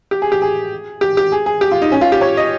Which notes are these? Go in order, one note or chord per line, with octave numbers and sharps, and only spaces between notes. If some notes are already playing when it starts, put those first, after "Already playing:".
G4
G#4
G4
G#4
G4
G4
G#4
G#4
G4
F4
D#4
C#4
F4
G4
C#5
D#5